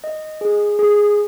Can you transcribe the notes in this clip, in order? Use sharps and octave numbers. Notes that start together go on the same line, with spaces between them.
D#5
G#4
G#4